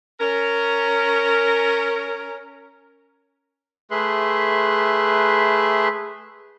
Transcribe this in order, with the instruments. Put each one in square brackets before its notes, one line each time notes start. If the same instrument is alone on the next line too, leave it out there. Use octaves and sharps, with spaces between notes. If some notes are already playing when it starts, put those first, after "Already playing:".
[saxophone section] C#4 A#4
[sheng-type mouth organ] A3 G#4 B4 E5 C6 F#6